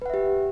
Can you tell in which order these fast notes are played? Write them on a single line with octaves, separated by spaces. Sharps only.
B4 F#5 E5 G4